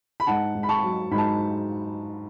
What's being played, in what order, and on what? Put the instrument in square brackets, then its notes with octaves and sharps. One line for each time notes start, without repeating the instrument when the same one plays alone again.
[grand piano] B5
G#2 F#5 A5
G#2
B5
A5 C#6
F#3
G#2 B5
A5